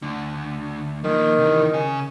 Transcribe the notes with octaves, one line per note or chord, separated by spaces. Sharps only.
D2 D3
D#3 F3 A#3
C3 E3
C#3 G#4